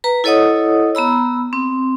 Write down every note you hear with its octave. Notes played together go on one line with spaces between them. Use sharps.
B4 A#5
E4 A4 C#5 D#5 F#5 D#6
B3 A#5 B5 E6
C4